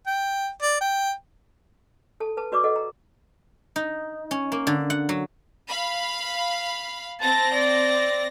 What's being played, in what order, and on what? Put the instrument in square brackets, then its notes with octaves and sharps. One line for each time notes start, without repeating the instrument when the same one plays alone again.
[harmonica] G5
D5
G5
[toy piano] A4 A5
B4 A5
F#4 B4 D5 C#6 D6 E6
A4 D#5 F#5
A#5
[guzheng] D#4
C#4
A#3
D3
F#5
F#3
[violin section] F5 B5
[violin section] C4 A#6 [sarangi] A5
[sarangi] D5